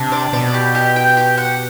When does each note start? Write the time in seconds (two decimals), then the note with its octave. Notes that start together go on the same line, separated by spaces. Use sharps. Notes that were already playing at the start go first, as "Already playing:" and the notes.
Already playing: C3 D4
0.12 D5
0.33 B2 D5
0.54 G4
0.75 G4
0.96 G5
1.17 G4
1.38 F#5